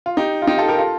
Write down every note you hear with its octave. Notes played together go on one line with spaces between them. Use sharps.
F4
D#4 G4
F4
D#4 G4
F4 A4
G4 A#4
F4 A4